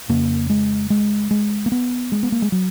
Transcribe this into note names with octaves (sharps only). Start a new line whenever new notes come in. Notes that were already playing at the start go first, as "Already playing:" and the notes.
F2 C#3 A#3
G#3
G#3
G#3
A#3
B3
G#3
B3
A#3
G#3
F#3